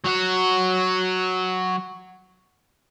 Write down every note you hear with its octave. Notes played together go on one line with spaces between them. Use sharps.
F#3 F#4